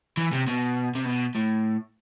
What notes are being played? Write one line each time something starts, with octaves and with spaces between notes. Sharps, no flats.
E3
C3
B2
C3
B2
A2